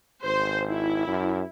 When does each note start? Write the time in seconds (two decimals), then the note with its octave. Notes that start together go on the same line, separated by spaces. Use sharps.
0.24 G#1 C5
0.68 E4
1.08 F#2